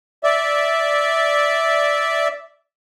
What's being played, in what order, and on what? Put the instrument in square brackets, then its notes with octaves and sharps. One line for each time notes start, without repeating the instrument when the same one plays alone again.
[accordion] D5 E5